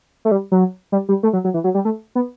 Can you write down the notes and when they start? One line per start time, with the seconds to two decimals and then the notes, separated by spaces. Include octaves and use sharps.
0.25 A3
0.31 G3
0.52 F#3
0.92 G3
1.09 G3
1.23 A3
1.33 F#3
1.44 F#3
1.54 E3
1.64 F#3
1.74 G3
1.85 A3
2.15 B3